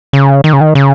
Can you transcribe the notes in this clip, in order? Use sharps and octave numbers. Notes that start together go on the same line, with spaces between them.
C#3
D#3
C#3
D#3
C#3